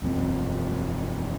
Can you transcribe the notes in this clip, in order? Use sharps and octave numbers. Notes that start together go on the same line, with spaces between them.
E1 F#2 C4